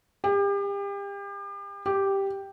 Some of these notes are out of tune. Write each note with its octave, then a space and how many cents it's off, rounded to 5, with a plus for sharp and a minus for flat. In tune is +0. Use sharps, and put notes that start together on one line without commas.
G4 +35
G4 +0